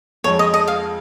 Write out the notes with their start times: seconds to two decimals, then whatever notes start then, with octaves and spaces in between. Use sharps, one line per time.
0.24 F2 F3 G#3 C#5
0.39 D#5
0.54 D#5
0.68 F5